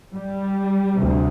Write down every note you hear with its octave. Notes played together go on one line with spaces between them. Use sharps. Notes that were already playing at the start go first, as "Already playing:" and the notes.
G3
D2 C3